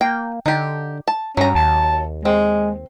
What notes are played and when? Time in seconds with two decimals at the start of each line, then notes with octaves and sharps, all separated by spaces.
0.01 A#3 G5
0.46 D3 D#4 G4
1.08 A5
1.37 G2 F#3 C#4 A#5
1.55 D#2 A5
2.25 G#3 C4